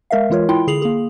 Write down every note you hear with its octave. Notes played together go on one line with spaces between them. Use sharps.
G#3 A#4 E5 F5
E3 G#3 F4 A#4 C#5
E4 F4 G5 C6
D3 G#4 C7 F7 F#7
A#3 G#4